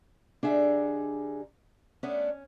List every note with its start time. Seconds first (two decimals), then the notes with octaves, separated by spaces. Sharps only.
0.43 D3 G3 D4 D#4 G#4 E5
2.03 A3 B3 C#4 D4